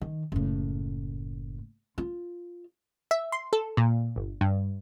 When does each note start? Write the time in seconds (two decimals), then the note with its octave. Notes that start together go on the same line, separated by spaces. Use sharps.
0.01 D#3
0.32 F#1 A2
1.98 F4
3.11 E5
3.32 C6
3.53 A4
3.77 A#2
4.16 G1
4.41 G2